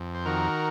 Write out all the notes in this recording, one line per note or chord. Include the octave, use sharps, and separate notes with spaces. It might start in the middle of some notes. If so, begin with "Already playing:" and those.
Already playing: F2
C5
D#3 F#4 A#4